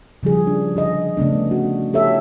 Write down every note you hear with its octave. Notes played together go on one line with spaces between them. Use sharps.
C#3 F3 G3 G#4
D4
D3 G#4 D#5
C#3 A3 B3 D4
F#4
G4 A4 C#5 E5